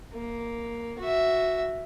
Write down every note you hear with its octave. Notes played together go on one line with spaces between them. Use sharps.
A#3
F#4 E5